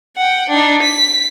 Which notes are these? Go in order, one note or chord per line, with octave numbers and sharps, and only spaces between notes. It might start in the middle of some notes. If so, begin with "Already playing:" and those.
F#5 G5
D4 D#4
B6